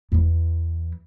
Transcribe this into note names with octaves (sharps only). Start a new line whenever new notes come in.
E2 E3